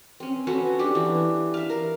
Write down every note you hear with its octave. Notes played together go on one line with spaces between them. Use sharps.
C4 C#4
B3 C#4 F#4 A4
D4 G4
E3
E5 F5
A#4